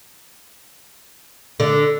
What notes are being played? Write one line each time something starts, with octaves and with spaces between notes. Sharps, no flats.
D3